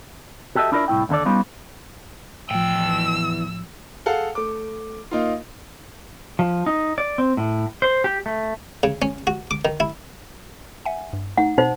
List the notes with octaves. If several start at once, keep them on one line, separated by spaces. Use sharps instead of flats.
F#4 G4 A4 C#5 D#5 E5
D4 E4 F4 A#4 D5
C2 A2 E4 G5
D#2 D3 D#4 A4 D5
G3 B3 C#4 D#4 F4
E2 A2 F3 G5 E6
G#4 A4 F5 F#5
A3 D6
A#3 D#4 F4
F3
D#4
D5
C4
A2
C5
G4
A3
C#3
C#4
F#4
D6
D#3
E4
E5 F#5 G#5
G2
A3 D#4 F#5
B2 D#4 C5